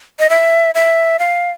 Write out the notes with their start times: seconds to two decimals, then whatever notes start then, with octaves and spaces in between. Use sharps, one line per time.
0.19 D#5
0.30 E5
0.75 E5
1.19 F5